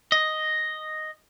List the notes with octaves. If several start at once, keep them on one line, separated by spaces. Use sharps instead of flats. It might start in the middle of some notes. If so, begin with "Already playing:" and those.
D#5